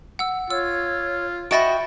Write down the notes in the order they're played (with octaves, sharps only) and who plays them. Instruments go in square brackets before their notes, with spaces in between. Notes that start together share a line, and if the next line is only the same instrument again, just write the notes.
[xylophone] F#5 E6
[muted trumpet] F4 [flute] C#5 [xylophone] E6
[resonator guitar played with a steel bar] F#4 D#5 E5 [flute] G5 [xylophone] B5 A6 D7